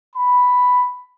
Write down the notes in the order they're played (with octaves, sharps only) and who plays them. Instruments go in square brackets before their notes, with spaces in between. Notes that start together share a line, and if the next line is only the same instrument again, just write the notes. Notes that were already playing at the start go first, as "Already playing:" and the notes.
[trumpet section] B5